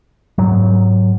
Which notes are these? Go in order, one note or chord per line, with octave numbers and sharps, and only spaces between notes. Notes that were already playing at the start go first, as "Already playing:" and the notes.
G#2 F#3